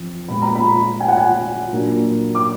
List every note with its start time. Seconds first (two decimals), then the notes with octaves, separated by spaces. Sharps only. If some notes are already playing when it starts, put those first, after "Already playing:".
Already playing: F2 F3
0.28 A#2 G#3 B3 B5
0.42 A#5
0.55 B5
1.00 G#5
1.08 F#5
1.17 G#5
1.72 A#2 F#3 A#3 D4
2.35 D6